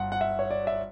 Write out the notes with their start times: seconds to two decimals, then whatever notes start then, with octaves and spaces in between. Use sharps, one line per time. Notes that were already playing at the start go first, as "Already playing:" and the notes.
Already playing: G1 F#5
0.12 F#5
0.21 E5
0.39 C#5
0.51 D5
0.67 E5